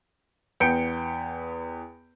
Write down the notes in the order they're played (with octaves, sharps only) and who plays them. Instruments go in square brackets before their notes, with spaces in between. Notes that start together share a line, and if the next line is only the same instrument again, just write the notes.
[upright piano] E2 B3 G5 G6 C#7 D7